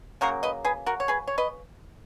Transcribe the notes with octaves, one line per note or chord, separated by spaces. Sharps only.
C#3 F#3 A#3 F#4 A#4
B4 D#5
G#4 B4
F#4 A#4
C#5
G#4 B4
C#5
B4 D#5